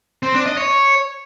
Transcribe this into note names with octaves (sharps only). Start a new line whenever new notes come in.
C4
D4
D#5
C#5